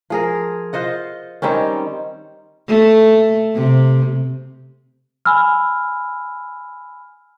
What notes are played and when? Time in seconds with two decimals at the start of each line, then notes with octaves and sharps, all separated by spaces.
0.10 F3 G#4 A#4
0.73 F4 C5 D#5 F#5
1.42 D#3 G3 C4 C#4
2.68 A3
3.55 C3
5.25 G#5 B5 E6 F6